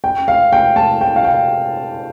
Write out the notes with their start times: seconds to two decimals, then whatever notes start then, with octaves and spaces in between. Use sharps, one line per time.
0.04 G5
0.28 F5
0.53 G5
0.76 A5
1.01 G5
1.16 F5
1.24 G5